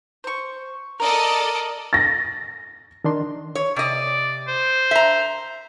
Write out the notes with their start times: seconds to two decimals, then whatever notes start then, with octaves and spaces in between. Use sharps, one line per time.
0.24 C5 C#6
1.00 A4 A#4 D5 D#5
1.93 A6 A#6
3.04 D#3 D4 C6
3.55 C#5
3.76 C3 D5 D#5
4.48 C5
4.91 E5 A#5